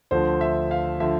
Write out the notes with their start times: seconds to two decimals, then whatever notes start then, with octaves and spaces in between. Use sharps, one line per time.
0.11 D2 D3 F3 C5
0.41 E5
0.71 F5
1.00 D3 F3 E5